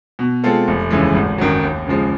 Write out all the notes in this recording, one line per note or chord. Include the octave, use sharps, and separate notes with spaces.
B2
G#3 C4 F4 A4
F1
D#2 C#3 E3 G#3
G#1
F#2 D#3 F#3
D#2
C#3 F3 G#3